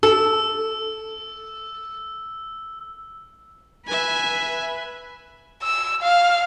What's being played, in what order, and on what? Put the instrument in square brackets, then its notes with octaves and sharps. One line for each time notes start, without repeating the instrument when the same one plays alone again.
[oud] A4 [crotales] E6
[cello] B4 [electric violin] E5 G#5
[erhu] E6
F5